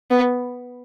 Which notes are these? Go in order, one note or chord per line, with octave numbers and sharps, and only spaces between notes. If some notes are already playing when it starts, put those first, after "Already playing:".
B3